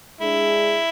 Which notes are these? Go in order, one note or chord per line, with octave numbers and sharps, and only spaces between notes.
G#3 D4 E4 G#4